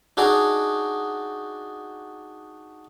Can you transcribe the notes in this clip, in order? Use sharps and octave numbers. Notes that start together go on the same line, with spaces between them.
D4 D#4 F#4 G#4 D5